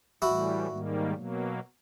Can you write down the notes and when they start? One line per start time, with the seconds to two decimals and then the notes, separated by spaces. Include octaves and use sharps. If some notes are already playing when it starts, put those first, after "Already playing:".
0.22 A2 E3 G3 E4 F#4
0.68 G#2 D#3 G3 A#3
1.14 B2 F#3 A#3